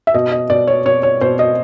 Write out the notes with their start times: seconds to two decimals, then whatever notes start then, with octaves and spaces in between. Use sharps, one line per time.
0.07 E5
0.14 B2 D#5
0.32 D#5
0.50 B2 D5
0.67 C#5
0.86 B2 C#5
1.03 C#5
1.21 B2 C5
1.39 D#5